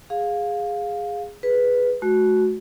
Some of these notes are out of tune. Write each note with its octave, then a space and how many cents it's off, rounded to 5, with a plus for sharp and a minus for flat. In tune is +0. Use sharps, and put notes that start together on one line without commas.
G#4 -10 F5 +15
G#4 +0 B4 +0
A3 -40 F#4 +0